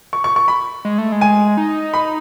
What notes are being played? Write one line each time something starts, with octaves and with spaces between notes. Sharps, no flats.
C#6
C#6
C#6
B5
G#3
A3
G#3
G#5
D#4
B5